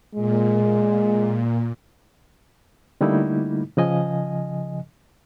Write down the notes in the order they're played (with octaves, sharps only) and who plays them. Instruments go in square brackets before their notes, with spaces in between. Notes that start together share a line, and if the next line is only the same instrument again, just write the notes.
[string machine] A#2 [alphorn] G#3
[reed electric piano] D3 G3 A3 A#3 D#4 E4
C#3 F3 D#5 G#5